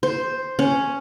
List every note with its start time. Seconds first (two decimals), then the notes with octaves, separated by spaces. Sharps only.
0.03 C5
0.59 C#4